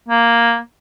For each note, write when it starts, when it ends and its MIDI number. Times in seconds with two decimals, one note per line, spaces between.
0.08 0.58 58